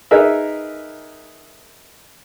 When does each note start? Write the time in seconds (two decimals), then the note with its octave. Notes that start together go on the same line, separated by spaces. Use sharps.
0.11 D#4 G#4 A#4 B4 E5